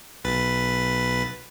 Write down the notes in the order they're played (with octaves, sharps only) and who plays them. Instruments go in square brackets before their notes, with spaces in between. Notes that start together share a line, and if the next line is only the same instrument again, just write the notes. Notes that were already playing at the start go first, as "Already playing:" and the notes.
[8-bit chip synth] B1 B4 A6